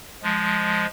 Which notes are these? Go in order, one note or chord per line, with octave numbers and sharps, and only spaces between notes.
F3 G#3